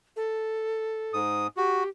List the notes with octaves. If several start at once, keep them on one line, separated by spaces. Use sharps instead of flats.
A4
G#2 D#6
F#4 G4